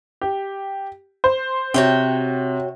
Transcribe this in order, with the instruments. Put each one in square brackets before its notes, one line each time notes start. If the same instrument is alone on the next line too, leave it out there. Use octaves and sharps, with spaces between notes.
[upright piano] G4
C5
[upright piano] C3 [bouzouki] F#4 C#5 G5